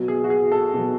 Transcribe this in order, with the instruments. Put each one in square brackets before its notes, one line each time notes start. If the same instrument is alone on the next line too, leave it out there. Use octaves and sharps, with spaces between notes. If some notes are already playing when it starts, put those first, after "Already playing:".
Already playing: [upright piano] B2 F#3
G#4
F#4
G#4
A4
B2 F#3